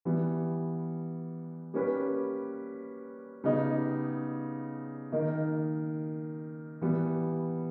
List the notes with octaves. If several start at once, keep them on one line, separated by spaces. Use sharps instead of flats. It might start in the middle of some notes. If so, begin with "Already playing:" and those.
E3 G3 B3
G3 A#3 C#4 G4 B4
C#3 G3 B3 D#4 G4
D#3 A#3 D#4 A#4
E3 G3 B3